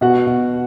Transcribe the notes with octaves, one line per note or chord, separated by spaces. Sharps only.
B2 F#4 F#5
B2